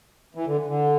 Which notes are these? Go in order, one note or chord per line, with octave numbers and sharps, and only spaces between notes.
E3
D3
D3